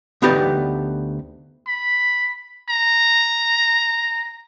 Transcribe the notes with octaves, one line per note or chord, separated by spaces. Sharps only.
D2 B3 D#4 G4 B4 D5
B5
A#5